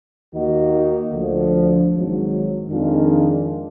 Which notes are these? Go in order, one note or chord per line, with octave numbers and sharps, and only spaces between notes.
D#2 D#3 A#3 D#4 F#4
D2 D3 F3
G#1 G#2 F#3
F2 D#3 G#3 D4 F4